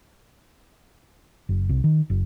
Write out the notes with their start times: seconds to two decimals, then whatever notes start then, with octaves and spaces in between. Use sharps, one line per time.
1.49 F#1
1.69 C2
1.84 D#3
2.10 F#1